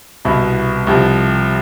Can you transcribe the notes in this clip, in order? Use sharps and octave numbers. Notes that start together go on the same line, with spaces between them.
C2 B2 B3 E4
C2 C3 F3